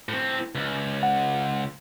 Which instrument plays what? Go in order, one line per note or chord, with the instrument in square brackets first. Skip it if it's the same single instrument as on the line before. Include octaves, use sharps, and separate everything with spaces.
[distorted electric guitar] A2 C4
C#2
[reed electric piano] F#5